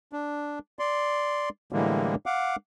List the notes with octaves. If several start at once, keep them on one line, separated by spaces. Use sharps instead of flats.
D4
D5 C6
A2 D3 E3 G3 G#3 A#3
F5 F#5 D6